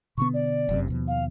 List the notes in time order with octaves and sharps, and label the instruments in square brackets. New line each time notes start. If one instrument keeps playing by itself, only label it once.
[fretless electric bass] B2 D3 B3 [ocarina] C#6
[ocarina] D5
[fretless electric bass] F1 F#2 C3
D#2 B2 F3
[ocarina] F5